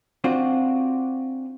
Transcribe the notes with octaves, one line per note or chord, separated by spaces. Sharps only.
C4 D4 F4 F#4